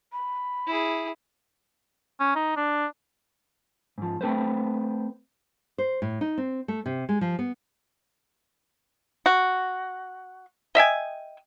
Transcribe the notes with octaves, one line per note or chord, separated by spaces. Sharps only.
B5
E4 G#4
C#4
D#4
D4
G#2 F3
A3 C4 A4 B4 C5
C5
A2
D#4
C4
A3
C3
G#3
F3
B3
F#4
D#5 E5 G5 G#5